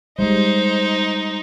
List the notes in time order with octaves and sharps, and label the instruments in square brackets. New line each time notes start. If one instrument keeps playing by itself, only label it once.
[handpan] G3 G#3 [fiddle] D#4 [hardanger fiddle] C5